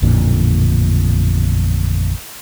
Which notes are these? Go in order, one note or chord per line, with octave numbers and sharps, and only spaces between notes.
A1 F2 A#2 D3